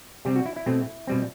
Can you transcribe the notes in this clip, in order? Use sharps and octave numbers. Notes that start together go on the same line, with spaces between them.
C3 G3 C4 G4
F#4
E4
E4
B2 A3 C4
B2 G3 C4